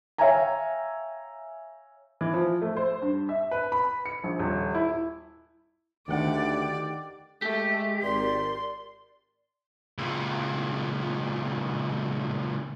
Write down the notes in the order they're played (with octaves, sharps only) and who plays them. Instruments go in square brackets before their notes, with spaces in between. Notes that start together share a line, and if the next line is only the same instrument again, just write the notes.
[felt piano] C#5 E5 F5 G5 G#5 A#5
[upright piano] E3
F3
A3
C5
G2
E5
B4
B5
C#7
A#1
D#1
E4
[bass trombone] D2 [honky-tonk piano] D#3 F#5 [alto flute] G4 [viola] D5
[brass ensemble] G#3 [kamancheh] A3 [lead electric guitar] G4
[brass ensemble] G#1 A#4 [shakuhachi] D5 [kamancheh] C6
[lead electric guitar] C#2 A#2